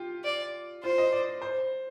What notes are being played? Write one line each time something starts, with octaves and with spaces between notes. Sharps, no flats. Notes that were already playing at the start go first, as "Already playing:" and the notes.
Already playing: F4 G4
D5
F4 C5
D#5
D5
C5